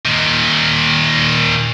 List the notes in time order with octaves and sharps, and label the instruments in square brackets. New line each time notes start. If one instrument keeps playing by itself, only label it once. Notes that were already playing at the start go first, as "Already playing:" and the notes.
[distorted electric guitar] A#2 D#3